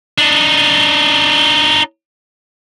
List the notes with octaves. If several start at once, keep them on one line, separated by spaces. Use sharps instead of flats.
D4 D#4